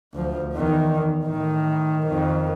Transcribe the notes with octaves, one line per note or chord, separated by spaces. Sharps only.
D2 F3
E2 D#3
A2 D#3
F2 D#3